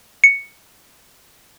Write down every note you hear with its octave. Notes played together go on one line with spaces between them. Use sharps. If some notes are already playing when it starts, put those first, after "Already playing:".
C#7